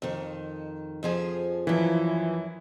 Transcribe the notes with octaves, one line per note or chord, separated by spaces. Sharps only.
F2 D#3
F2 F3 G#4
F#2 E3 F3 E4